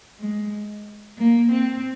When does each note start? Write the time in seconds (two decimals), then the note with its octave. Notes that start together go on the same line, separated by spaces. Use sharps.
0.19 G#3
1.18 A#3
1.51 C4